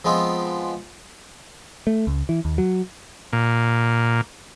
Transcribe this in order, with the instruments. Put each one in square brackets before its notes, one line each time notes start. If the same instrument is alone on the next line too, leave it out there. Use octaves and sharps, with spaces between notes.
[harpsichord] F3 G#3 B3 C4
[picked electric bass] A3
C#2
E3
D#2
F#3
[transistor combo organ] A#2